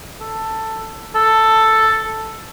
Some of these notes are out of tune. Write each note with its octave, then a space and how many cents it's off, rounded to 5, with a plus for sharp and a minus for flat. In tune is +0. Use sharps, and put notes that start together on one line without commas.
A4 +10
A4 +5